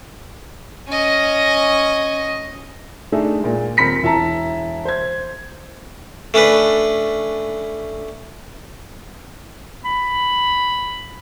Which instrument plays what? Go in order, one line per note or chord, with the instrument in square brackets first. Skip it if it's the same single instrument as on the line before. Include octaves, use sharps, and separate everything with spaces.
[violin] C#4 D#5
[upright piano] A3 D4 D#4 G#4 E5
A#2 G#3
D#1 C4 A#4 B5 B6 C#7
E1 E4 E5 A5 A#5
C5 G#6
[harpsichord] A3 C#4 D4 B4
[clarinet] B5